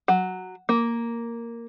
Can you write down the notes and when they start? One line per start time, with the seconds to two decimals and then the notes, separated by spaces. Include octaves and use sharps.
0.08 F#3
0.69 A#3